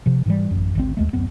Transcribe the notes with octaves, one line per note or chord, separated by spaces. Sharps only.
C3 F3
G#2 E3 G3
A1 F#2
G#1 D2 F3 C4
D#2 G#3 A3
D1 F#2 B3 C4